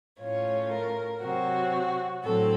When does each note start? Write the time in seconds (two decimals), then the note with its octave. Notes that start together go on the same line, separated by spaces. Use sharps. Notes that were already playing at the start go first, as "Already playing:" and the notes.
0.20 A2 A3 C#4 F4 C#5
0.71 A#4
1.22 C3 F#3 C4 F#4
2.24 A2 F#3 C4 A4